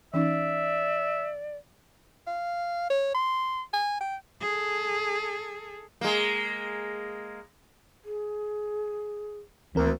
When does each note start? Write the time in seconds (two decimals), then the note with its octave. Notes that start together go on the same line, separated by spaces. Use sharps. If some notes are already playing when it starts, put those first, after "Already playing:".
0.14 E3 C#4 D#4 D5 E5
2.27 F5
2.90 C#5
3.14 C6
3.73 G#5
4.01 G5
4.41 G#4 A4
6.01 G#3 A#3
8.05 G#4
9.75 D2 E3 A#3 C4 A#4